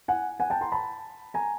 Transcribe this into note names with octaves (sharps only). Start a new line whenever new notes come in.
F#5 G#5
F#5 G#5
G5 A5
A#5 C6
A5 B5
G#5 A#5